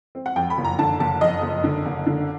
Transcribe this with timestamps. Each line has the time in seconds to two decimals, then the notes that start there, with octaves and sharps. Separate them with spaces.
0.15 C4
0.26 F#5
0.36 F2 G5
0.50 B5
0.58 F#1
0.64 A#5
0.79 D3 A5
1.00 F#1 A5
1.21 F2 D#5
1.43 F#1
1.64 D3
1.85 F#1
2.07 D3